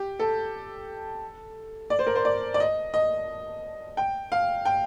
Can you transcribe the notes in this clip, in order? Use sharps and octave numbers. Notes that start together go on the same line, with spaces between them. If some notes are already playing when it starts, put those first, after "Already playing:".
Already playing: G4
A4
D5
C5
A#4
C5
D5
D5
D#5
D#5
G5
F5
G5